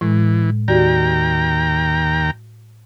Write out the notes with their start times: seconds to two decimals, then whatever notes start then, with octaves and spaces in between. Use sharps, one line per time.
0.01 A2 E3 G#3
0.68 D#2 F#4 G4 D5 G5 A#5